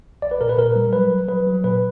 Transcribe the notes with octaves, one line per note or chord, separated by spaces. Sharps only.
B1 D5
B4
A#2 A#4
B4
A#2 A#4
G3
F#3 B4
F#3
F#3 B4
F#3
A#2 B4